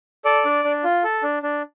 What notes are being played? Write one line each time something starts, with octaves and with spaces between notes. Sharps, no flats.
A4 D5
D4
D4
F4
A4
D4
D4